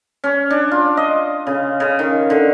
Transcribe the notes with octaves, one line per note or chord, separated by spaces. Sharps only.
C#4
D4
F4
D#5
C#3
C#3
D#3
D3